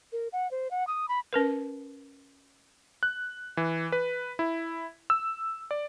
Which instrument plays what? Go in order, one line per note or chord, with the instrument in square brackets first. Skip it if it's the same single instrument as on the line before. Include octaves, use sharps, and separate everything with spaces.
[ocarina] A#4
F#5
C5
F#5
D#6
B5
[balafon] C#4 A#4 B4
[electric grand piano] F#6
E3
B4
E4
E6
D5